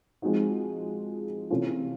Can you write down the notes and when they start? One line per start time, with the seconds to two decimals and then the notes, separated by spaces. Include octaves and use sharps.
0.22 F3 G#3 C4 D#4 F#4
1.50 C3 E3 A3 C#4 F4